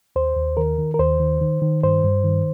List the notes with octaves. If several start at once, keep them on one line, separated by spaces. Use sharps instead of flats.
D#2 C5
D#2
D#3 A#4
D#3
A#4
D#2 C5
D#3
D#3
D#3
G2 C5
G2
D#3